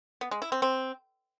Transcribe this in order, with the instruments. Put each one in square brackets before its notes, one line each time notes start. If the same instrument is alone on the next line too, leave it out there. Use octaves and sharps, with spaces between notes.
[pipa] B3
G#3
E4
C4
C4